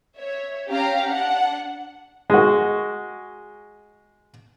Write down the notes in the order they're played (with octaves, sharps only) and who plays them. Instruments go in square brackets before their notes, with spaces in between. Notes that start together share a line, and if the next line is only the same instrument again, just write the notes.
[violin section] C#5 E5
C#4 G4 F5 A#5
D4 F#5
[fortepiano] G#3 F#4